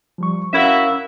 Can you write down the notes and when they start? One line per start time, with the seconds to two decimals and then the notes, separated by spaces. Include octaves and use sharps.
0.18 F3 G3 C#6
0.53 C#4 E4 F#4 A#4 E5 F5